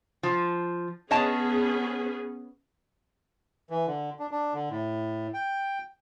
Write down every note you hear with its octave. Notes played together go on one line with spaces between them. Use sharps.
F3
B3 C#4 G#4 C#5 D#5 A5
E3
D3
D4
D4
D3
A2
G5